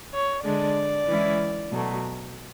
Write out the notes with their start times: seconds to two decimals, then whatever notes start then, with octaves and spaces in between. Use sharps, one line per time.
0.12 C#5
0.44 D3 G#3 D4 D5
1.07 E3 G#3 C#4 E4
1.71 B2 F#3 A3